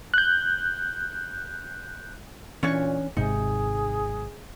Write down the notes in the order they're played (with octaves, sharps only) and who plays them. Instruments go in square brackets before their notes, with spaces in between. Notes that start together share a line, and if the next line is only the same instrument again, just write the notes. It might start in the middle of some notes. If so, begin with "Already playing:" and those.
[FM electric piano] F#6 G6
[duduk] A#2 [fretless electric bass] E3 [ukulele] C#4 D4 C#5
[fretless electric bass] G#1 G#2 C3 [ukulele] D#4 [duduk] G#4